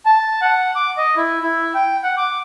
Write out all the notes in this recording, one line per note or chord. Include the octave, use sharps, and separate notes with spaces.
A5
F#5
D6
D#5
E4
E4
G5
F#5
D6